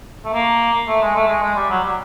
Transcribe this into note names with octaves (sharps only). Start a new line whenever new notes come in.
A3
A#3
A3
G#3
A3
G#3
G#3
G3
F#3
G3